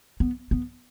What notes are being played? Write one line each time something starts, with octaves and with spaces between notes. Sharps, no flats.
B3
B3